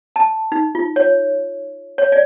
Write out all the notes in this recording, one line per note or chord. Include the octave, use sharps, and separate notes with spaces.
A5
D#4
F4
C#5
C#5
D5